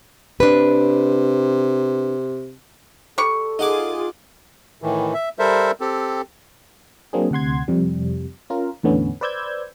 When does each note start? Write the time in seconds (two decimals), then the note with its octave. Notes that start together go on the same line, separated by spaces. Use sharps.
0.40 C3 D4 B4
3.18 G3 A4 C#6
3.59 D#4 F4 G#4 F#5 D6
4.82 A2 D#3 E3
5.14 E5
5.39 G3 A4 A#4 C5 E5
5.81 C4 G4 A4
7.13 F#3 A#3 C4 D4 G#4
7.31 D2 C3 F#5 C6 G#6
7.68 F2 C3 G3
8.50 C#4 F4 A#4
8.83 E2 A2 D3 B3 C#4
9.21 B4 C5 D5 E6 G6 G#6